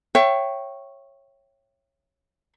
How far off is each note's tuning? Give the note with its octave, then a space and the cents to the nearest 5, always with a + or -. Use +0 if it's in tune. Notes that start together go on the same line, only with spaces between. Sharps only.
C#5 -15 E5 +30 G5 -15